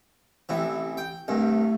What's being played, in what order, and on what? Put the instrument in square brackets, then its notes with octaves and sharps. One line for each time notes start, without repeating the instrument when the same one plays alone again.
[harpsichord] A1 C3 E3
G5
[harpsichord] C2 G2 [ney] A3